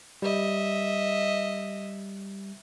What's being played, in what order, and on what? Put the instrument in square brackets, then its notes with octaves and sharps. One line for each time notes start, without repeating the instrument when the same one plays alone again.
[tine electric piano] G3 [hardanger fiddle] D#5 E5